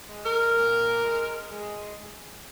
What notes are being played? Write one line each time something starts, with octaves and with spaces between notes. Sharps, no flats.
G#3
A#4
A#2
G#3
G#3